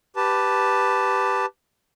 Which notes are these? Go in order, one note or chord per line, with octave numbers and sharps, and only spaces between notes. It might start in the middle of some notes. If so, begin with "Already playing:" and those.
G4 B4 A5